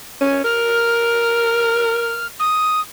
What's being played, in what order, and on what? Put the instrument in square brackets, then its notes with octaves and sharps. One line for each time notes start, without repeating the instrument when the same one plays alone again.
[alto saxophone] C#4 [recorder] G#5
[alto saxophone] A#4 [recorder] F6
[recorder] D#6